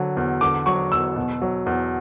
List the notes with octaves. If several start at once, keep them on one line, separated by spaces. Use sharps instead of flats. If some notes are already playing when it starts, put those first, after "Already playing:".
Already playing: D3 F#3
E2
D3 D6
F#3 C#6
E2 E6
B2
F#3
E2